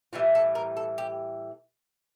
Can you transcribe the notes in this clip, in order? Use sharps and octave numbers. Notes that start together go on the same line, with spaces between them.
A2 E3 G3 F4
A4
A#4
A4
G4